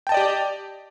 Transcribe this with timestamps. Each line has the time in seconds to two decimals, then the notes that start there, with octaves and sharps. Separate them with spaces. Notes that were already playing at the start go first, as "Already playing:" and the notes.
0.07 G5
0.09 A5
0.12 D#5
0.14 D5
0.17 G4